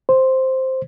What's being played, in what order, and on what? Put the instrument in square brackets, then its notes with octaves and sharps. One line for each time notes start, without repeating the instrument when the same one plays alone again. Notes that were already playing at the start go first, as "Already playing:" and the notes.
[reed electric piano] C5